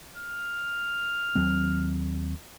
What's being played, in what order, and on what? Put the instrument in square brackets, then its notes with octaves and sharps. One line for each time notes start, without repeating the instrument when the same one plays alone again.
[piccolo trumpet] F6
[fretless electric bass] D#2 F#3 C4